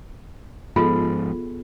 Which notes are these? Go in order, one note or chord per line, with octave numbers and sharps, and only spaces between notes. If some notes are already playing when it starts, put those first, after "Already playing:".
G#2 F3 B3 F4 G#4 A4